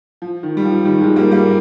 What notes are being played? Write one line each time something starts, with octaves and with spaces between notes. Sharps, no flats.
F3
D#3
G3
F3
D#3 G3
F3 G#3
G3 A#3
G3 A#3